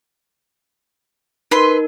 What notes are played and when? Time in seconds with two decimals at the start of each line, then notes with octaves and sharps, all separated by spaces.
1.51 D#4 A#4 B4 C6